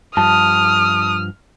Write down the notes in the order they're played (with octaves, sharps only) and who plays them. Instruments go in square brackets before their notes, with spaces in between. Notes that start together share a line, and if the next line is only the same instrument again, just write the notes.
[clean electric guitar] G2 F3 [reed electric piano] A5 [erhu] D#6 [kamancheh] F6